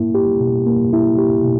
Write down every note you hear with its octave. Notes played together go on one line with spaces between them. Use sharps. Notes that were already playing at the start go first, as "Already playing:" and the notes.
Already playing: A#3 E4
G4
B2
A#3
E4
G4
B2